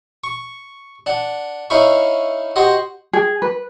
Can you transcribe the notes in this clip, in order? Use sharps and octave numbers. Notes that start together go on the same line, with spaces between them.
C#6
D4 F#5
C#4 D#4 E4 E5 F5 C#6
F#4 G4 C5 D#5 F#5
G#4
B4